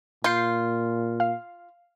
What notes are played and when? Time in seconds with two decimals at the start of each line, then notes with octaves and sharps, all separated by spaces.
0.24 A#2 F4 G6 C7
1.20 F5